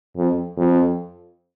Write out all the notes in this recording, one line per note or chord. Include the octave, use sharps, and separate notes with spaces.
F2
F2